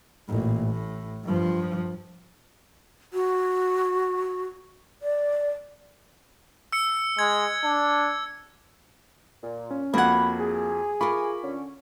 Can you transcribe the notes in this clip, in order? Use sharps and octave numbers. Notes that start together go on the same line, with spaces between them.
A1 A#2
A2
G2 F3
F#4
D5
E6 C#7
G#3 G#6
D4
A#2
C#4
F2 A#3 F#4 F#5 B5 G#6
G#4
F4 A#4 B5 C#6 D6
D3 C#4